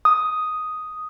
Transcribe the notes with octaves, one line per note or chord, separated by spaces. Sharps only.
D#6